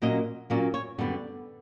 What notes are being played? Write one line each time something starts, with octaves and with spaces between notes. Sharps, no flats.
A#2 F#3 A#3 C#4 D#5
A#2 F#3 A#3 C#4 D5
C#5
F#2 D3 G3 B3 D5